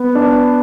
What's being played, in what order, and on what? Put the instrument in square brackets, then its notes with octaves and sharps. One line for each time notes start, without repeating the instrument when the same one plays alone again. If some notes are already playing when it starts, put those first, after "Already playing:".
Already playing: [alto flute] B3
[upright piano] D4